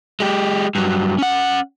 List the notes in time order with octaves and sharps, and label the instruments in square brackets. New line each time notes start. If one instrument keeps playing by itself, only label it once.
[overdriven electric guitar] G#3 G4
G2 F#3
C#4 F#5